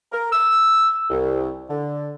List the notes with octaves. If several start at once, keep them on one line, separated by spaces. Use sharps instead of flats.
A#4
E6
C2
D3